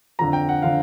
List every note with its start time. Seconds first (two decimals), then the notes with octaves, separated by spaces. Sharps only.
0.19 F2 D3 F3 A#5
0.33 G5
0.49 F#5
0.62 D3 F3 F5